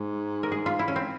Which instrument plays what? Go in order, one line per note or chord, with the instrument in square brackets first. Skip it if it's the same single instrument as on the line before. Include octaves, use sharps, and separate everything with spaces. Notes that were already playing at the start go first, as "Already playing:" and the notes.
Already playing: [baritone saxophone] G#2
[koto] A#4
G#4
F4
E4
C#4
C4